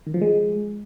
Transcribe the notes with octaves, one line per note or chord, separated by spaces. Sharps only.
D#3
F3
G#3